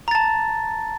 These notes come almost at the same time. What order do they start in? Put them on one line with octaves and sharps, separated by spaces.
A#5 A6 A5